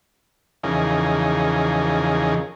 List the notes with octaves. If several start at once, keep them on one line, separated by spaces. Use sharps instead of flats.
E2 C#3 F3 D#4 G#4 A#4